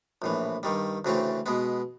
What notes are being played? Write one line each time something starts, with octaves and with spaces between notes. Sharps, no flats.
A#1 A2 E3
G2 D#3 G3
D2 C#3 E3 A3 C4
B2 G#3 B3